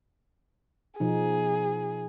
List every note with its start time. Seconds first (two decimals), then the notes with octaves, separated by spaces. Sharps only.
1.00 B2 F3 D#4 G#4